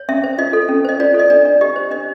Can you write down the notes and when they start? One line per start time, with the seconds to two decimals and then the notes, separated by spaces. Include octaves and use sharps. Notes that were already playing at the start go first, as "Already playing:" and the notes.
Already playing: C#5
0.09 C#4 E5
0.24 C5
0.38 F4 D#5
0.53 A4
0.69 C#4
0.85 C5 D#5
1.00 F4 D5
1.14 A4
1.19 D#5
1.30 D4 D5
1.45 D4
1.61 G4 D#5
1.76 C5
1.91 D4 D#5